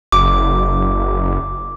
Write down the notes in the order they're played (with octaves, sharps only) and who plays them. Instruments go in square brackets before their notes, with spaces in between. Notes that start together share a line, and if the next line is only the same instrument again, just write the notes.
[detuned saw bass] F#1 [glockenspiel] D6